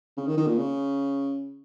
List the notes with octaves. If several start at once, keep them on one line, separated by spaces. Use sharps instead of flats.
C#3
D#3
D#3
A#2
C#3